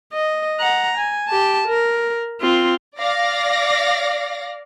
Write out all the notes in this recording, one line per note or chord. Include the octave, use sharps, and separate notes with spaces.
D#5
F#5 A#5
G#5
G4 A5
A#4
C4 F4
D5 F5 A#6